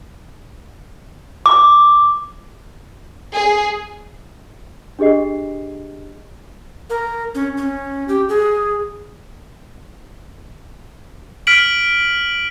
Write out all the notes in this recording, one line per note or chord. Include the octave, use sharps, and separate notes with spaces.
D6
G#4
D4 G4 G#4 D#5 C7
A#4
C#4
C#4
G4
G#4
F6 B6 D7 F#7